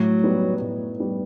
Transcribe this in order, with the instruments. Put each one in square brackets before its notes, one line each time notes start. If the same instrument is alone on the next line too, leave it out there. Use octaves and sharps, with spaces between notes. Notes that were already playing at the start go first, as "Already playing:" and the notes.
Already playing: [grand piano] A2 [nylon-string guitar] F#3 A3
[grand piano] G3 B3 D#4
A2
G3 B3 D#4